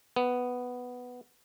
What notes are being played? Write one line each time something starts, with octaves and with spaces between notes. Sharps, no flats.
B3